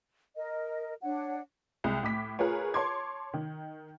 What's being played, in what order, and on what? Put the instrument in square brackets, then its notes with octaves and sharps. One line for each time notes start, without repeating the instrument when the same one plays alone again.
[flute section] A#4 D#5
D4 C#5 F#5
[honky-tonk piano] C2 G#3
A2 D6 B6
F4 G#4 A#4 B4 C#5
C#5 A5 C6 D6 G#6
D#3